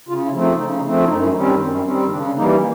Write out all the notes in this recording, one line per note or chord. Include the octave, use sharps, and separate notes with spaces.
C#3 F4
E4
F3 A3 C4
D#4
C#3 D#4
D#4
F3 A3 C4
D4
E4
F#2 D#4
E4
D#3 G3 C4 C#4
D4
F#2 C4
D#3 G3 C4 C#4
C#3 D4
E3 G3 A#3 D#4